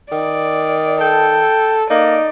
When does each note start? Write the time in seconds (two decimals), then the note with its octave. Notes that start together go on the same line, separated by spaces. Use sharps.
0.12 D#3 D5
1.01 A4 G5
1.90 A#3 D#4 D5